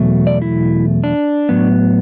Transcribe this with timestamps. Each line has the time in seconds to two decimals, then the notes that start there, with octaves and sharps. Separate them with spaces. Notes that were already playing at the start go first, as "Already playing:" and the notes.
Already playing: E2 B2 F#3 A3
0.27 D5
0.42 E4
1.04 D4
1.49 A2 F#3 B3